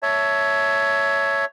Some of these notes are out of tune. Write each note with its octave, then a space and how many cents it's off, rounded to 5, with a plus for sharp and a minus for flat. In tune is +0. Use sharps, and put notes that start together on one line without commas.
C#5 +10 E5 +0 A5 +0